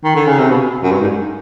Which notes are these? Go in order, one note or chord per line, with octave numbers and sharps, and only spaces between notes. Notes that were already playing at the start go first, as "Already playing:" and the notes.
D#3
D3
C#3
C3
B2
F#2
G2
G#2